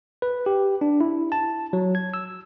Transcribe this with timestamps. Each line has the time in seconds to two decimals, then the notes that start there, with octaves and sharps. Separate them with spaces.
0.22 B4
0.46 G4
0.81 D4
1.01 E4
1.32 A5
1.73 F#3
1.95 G#6
2.14 E6